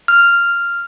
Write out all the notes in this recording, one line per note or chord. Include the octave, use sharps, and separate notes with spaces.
F6